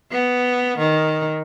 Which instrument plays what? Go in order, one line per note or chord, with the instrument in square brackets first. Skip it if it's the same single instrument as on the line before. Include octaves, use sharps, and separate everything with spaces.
[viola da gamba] B3
D#3